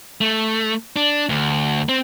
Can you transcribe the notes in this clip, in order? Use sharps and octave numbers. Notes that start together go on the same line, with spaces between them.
A3
D4
D2
C4